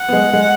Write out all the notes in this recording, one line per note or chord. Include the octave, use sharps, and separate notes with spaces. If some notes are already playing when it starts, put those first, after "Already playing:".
Already playing: F#5
B3
G#3
G#3